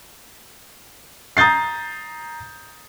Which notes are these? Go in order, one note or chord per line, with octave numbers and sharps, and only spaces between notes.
A#5 D#6 G6 A6 C7